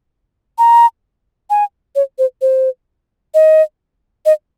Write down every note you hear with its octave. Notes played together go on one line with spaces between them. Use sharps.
A#5
G#5
C#5
C5
C5
D#5
D#5